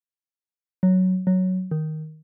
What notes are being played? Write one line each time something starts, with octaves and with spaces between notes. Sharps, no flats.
F#3
F#3
D#3